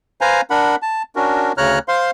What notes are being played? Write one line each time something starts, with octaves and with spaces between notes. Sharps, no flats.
B4 C5 F5 G#5 A#5
D4 A#4 F#5 B5
A5
C#4 D4 F#4 A#4
D2 C#3 C#5 A#5 F6 F#6
C5 F5 C6